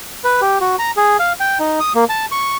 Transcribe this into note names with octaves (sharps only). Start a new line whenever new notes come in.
B4
G4
F#4
A#5
G#4
F5
G5
D#4
D#6
A#3
A5
C#6